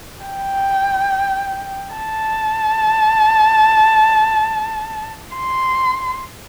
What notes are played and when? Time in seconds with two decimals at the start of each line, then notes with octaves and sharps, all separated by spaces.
0.25 G5
1.95 A5
5.36 C6